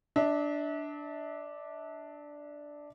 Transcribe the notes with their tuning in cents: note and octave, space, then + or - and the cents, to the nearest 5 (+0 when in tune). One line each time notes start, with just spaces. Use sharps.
D4 +0 E5 -40